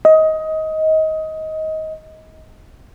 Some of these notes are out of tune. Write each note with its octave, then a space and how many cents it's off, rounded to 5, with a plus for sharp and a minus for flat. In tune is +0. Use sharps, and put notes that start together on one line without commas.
D#5 +20